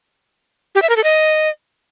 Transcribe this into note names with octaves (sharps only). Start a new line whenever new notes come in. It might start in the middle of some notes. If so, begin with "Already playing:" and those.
G4
E5
A#4
A4
D#5